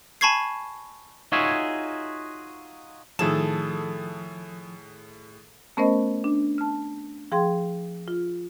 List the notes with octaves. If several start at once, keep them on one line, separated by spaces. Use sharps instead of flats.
G#5 A5 B5 C#6 G#6 C7
D#4 F4 F#4 G#4 C#5 E5
A2 D#3 F3 D#4 G#4 A4 E7
A3 B3 C#4 A#4 C5 D#5
D4
A5 F6
F3 G#4 G5 C6
F4